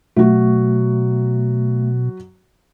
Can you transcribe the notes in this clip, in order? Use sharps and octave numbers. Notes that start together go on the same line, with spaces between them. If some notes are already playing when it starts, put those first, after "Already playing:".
B2 F#3 A3 F#4